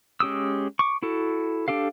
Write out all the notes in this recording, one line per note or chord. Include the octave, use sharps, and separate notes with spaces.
G#3 C#4 G4 D#6 E6
C#6 D6
E4 F#4 A4
D4 G4 A4 F5